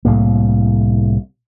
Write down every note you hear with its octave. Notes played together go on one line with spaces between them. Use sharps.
C2 A2 A#3